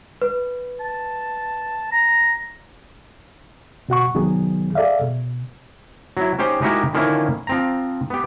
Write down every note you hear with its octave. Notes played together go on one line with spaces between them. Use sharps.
B4
A5
A#5
B2 F#4 F#5 C#6
C2 D#3 F#3 B3 G#4
G#4 A4 D5 E5 F5
B2
F#3 E4
C#4 D#4 G4 C5
G#3 D#4 E4 F#4 G4 A#4
D3 D#3 F3 A#3 C#4 E4
F3 C4 A#5
B3 G4